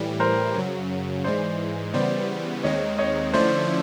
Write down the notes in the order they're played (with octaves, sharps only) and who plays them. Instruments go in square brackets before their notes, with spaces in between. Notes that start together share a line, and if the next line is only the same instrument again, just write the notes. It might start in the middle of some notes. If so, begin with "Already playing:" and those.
Already playing: [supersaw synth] A2 E3 G3
[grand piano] A#4 C5
[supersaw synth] F#2 C#3 F#3
[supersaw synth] G#2 E3 G#3 [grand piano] C5 D5
[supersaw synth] C#3 E3 G3 B3 [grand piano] C5 D5
[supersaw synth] D#2 D#3 G#3 C4 [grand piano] C#5 D#5
[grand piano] C#5 D#5
[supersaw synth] D3 F3 A3 C#4 E4 [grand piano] C5 D5